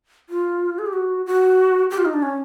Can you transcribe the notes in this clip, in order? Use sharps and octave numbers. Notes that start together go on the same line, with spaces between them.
F4
G#4
G4
F#4
F#4
G4
F4
D#4
D4
C#4